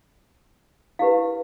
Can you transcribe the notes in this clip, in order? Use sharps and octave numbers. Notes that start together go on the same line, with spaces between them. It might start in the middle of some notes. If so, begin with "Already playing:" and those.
E4 G4 B4 F5